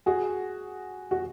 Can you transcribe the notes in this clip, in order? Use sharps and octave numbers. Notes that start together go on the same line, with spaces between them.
F#4 G#4
F#4